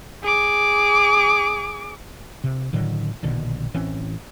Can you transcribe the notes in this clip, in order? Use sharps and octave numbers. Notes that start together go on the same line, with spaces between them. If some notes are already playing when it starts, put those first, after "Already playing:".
G#4 D6
C3
A2 D3 D#3 F#3
A#1 B2 D3 D#3
A1 E3 C4 C#4